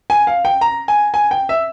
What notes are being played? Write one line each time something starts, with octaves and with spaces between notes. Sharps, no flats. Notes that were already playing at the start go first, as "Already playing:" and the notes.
G#5
F5
G5
A#5
G#5
G#5
G5
E5